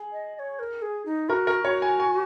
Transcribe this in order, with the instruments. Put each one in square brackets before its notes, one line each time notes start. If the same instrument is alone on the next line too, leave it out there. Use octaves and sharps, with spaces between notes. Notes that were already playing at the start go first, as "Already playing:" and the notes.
Already playing: [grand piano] G#4
[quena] D#5
D#5
C#5
A#4
G#4
D#4
[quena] F#4 [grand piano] A#4
[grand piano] A#4
[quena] F#4 [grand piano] C#5
[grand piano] G#5
G#5